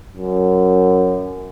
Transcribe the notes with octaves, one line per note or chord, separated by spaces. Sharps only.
F#2